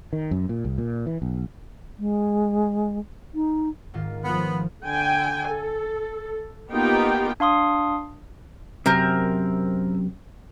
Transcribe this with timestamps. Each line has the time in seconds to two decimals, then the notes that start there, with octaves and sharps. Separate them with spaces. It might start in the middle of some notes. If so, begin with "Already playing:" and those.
0.13 D#3
0.31 F#2
0.49 A#2
0.64 C2
0.78 A#2
1.06 E3
1.22 B1
1.99 G#3
3.35 D#4
3.94 G#2 D#3 F4
4.24 F3 B3
4.85 D3 G5 G#5
5.49 A4
6.71 A#3 B3 D#4 F4 G4 G5
7.40 D4 F5 C6 D#6
8.86 F#2 C3 C4 A#4